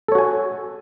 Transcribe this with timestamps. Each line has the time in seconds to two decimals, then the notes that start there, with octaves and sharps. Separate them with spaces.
0.08 A4
0.12 C#5
0.15 F#4
0.18 G#5